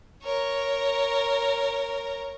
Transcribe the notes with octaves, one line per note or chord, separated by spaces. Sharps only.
A#4 C#5